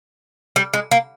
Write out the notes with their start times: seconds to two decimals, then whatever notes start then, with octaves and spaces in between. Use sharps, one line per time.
0.56 G3
0.73 G#3
0.91 A#3